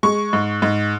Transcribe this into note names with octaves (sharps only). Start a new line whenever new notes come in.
G#3 C#6
G#2
G#2